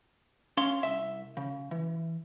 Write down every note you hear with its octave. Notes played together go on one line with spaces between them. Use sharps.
C#4 F5 C6
C2 E5
C#3
E3